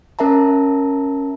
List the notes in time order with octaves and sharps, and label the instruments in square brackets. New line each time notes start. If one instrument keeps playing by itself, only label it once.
[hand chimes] C#4 A#4 E5 A5 A#5